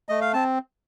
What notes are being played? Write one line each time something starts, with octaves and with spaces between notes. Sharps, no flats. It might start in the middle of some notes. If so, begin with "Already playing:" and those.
A3 D#5
F5
C4 A5